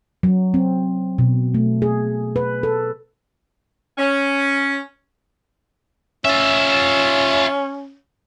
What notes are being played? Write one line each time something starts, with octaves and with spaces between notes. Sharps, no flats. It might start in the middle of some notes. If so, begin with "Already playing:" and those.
F#3
C4
B2
A3
G#4
B4
A4
C#4
C#4 F4 E5